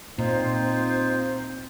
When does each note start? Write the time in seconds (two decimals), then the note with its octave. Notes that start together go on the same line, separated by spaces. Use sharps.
0.18 A#2 C4 D#4 F4 C5